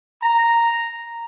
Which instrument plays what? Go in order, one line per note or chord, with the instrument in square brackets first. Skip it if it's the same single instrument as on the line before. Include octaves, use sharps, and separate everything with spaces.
[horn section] A#5